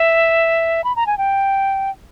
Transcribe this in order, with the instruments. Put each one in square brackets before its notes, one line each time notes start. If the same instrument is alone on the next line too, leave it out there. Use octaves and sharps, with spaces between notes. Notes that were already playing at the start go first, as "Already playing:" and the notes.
Already playing: [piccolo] E5
B5
A#5
G#5
G5